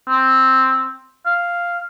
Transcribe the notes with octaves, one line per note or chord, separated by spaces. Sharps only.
C4
F5